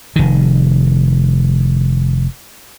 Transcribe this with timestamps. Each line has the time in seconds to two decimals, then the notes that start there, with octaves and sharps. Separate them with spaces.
0.16 F1 D#3